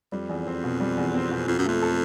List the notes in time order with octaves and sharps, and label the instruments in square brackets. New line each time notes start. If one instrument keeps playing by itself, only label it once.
[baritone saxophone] F2 [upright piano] G3
[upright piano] E2
C4
B2
G3
E2
C4
B2
[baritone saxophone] F2 [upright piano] F4
[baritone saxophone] F#2
[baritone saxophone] F2 [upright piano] A3
[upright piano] A4